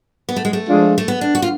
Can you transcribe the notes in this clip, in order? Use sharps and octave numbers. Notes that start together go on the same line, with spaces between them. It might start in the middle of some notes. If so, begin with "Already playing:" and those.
B3
A3
G#3
A3
F3 G#3 D4 F4 G#4
A3
B3
D4
F#4
F4